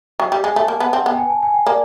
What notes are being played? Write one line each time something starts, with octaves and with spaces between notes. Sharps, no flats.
F#3 G5
G3 G5
G#3 G#5
A3 A5
A#3 G#5
B3 A5
C4 F#5
B3 G5
G#5
A5
G#5
G5
A#3 D5